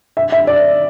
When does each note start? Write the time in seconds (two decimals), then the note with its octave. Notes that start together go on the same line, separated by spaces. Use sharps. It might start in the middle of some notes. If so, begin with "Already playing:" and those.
0.17 E5
0.32 E5
0.47 D5